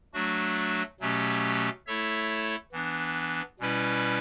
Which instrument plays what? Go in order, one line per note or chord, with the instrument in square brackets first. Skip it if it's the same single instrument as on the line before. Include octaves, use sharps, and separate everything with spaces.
[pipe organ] F#3 A3 D4 F#4
B2 F#3 A3 C#4 G4
A3 E4 A4 C#5 E5
E3 B3 D4
B2 G3 C#4 E4 B4